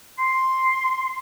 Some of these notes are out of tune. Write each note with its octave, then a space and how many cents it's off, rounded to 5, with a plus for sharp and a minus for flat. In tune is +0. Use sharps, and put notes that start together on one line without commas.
C6 +5